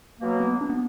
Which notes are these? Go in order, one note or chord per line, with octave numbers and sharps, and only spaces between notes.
B2 F#3 A#3
B3
D4
B3